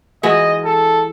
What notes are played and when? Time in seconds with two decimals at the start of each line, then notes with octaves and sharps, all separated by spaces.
0.23 E3 G#3 F#4 D#5
0.65 A4